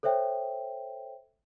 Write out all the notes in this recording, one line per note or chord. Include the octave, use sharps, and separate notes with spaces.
A4 C5 C#5 E5 G5